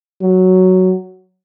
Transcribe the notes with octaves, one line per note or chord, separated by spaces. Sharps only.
F#3